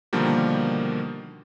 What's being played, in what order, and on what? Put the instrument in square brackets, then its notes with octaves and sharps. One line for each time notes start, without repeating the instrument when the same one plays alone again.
[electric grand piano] B2 D3 D#3 F3 G3 A#3